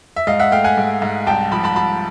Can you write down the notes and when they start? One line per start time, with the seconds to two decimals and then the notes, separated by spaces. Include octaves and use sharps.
0.16 E5
0.27 G#2 D#5 F5
0.39 E5 F#5
0.52 A3 F5 G5
0.64 F#5 G#5
0.78 G#2
1.02 G#2
1.27 C2 G5 A5
1.51 F3 A5 B5
1.64 A5 B5
1.76 C2 A5 B5